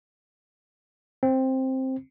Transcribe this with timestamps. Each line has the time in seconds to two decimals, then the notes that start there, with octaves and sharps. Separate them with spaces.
1.23 C4